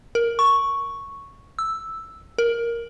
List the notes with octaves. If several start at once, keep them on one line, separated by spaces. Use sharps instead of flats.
A#4
C#6
E6
A#4